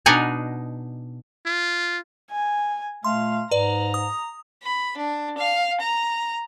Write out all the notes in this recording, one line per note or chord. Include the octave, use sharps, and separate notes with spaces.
B2 D4 D#4 F#5 G#5 A#5
F4
G#5
A#2 A3 F5 C6
G#2 B4 D5 A#5
D#6
B5
D4
F5
A#5